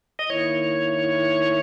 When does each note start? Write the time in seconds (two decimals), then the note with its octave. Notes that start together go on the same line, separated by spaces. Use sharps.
0.19 D#5
0.29 D#3 A#3 E4 C#5